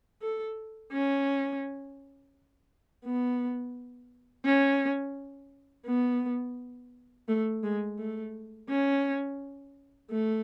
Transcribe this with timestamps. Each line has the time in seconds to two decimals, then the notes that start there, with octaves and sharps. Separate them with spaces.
0.22 A4
0.92 C#4
3.05 B3
4.45 C#4
5.86 B3
7.28 A3
7.63 G#3
7.99 A3
8.69 C#4
10.11 A3